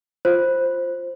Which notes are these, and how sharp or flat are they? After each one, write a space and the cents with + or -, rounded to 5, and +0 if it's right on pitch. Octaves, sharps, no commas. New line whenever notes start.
F4 +0 C5 +10